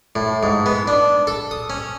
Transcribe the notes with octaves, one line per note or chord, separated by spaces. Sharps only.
A2
G#2
B3
D4
A4
D#6
C#4